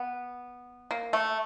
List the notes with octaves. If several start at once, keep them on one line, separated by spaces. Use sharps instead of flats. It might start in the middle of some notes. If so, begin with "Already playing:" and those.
Already playing: B3
A#3
A3